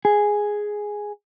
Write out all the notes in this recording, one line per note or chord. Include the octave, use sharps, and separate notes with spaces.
G#4